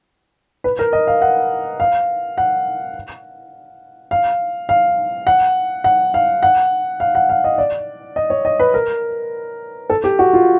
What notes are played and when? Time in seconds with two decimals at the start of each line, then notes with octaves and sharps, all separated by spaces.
0.64 B4
0.79 A#4
0.93 D#5
1.07 F5
1.22 F#5
1.80 F5
2.38 F#5
4.11 F5
4.69 F5
5.27 F#5
5.84 F#5
6.14 F5
6.43 F#5
7.00 F5
7.15 F#5
7.29 F5
7.44 D#5
7.58 D5
8.16 D#5
8.30 C#5
8.45 D#5
8.60 B4
8.74 A#4
9.90 A4
10.04 G4
10.19 F#4
10.33 F4